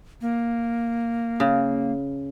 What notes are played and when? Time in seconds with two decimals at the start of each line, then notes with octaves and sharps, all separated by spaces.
0.21 A#3
1.40 C#3